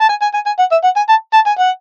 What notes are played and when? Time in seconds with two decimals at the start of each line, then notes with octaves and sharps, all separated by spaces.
0.01 A5
0.09 G#5
0.22 G#5
0.34 G#5
0.46 G#5
0.59 F#5
0.72 E5
0.84 F#5
0.96 G#5
1.09 A5
1.34 A5
1.47 G#5
1.59 F#5